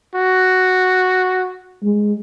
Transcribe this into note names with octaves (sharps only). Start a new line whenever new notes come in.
F#4
G#3